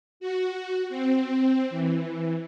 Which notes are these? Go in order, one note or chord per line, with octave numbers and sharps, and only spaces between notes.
F#4
C4
E3